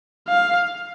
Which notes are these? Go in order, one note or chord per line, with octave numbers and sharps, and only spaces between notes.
F5